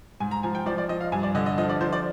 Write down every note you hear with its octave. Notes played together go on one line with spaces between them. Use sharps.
G#2 G#5
A#5
F3 G#5
G5
F3 D5
D5
F3 D#5
F5
G2 G#5
D5
D3 D#5
D#5
F3 D#5
D5
F3 C5
D5